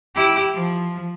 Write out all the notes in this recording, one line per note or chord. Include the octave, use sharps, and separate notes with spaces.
E4 G4
F3